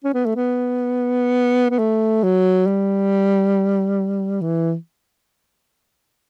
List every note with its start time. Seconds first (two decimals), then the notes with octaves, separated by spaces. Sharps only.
0.04 C#4
0.14 B3
0.26 A3
0.36 B3
1.70 B3
1.79 A3
2.23 F#3
2.67 G3
4.41 E3